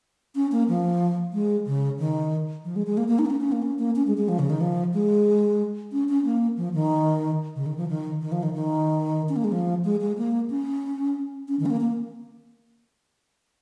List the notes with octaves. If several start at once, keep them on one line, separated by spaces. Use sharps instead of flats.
C#4
A#3
F3
G#3
C#3
D#3
F3
G#3
G#3
A#3
A#3
D#4
A#3
C#4
C#4
A#3
C#4
A#3
C#4
G#3
G#3
F3
C#3
D#3
F3
G#3
C#4
C#4
A#3
F3
D#3
C#3
D#3
F3
D#3
D#3
F3
D#3
D#3
C#4
A#3
G#3
F3
G#3
G#3
A#3
C#4
C#4
D#3
C#4
A#3
A#3